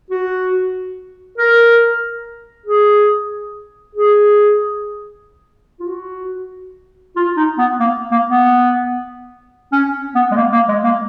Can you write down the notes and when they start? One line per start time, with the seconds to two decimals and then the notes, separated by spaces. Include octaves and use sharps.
0.10 F#4
1.38 A#4
2.66 G#4
3.95 G#4
5.80 F4
5.87 F#4
7.16 F4
7.36 D#4
7.58 B3
7.80 A#3
8.11 A#3
8.28 B3
9.72 C#4
10.15 B3
10.31 G#3
10.36 A#3
10.52 A#3
10.68 G#3
10.84 A#3